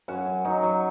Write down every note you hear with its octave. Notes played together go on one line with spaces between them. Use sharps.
F#2 C#4 F#4
F#2
F#3 D#4
F#3